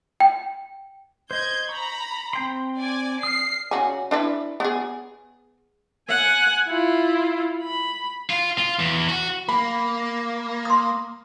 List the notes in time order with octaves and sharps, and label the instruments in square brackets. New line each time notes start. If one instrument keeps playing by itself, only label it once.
[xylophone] G5
[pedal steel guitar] C5 D#5 [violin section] G6 G#6
[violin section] A#5 B5 [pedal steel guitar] C#6
[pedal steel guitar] C4 G5 C6
[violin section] D5 G#5
[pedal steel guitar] D#6 F6 [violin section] C7
[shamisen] C#3 F#4 G#5
D4 E4 B4
B3 G#4
[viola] F#5 G#5
E4 F4
B5
[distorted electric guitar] F4
F4
E2
F#4
[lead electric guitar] A#3 [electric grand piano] B5
[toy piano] C6 D#6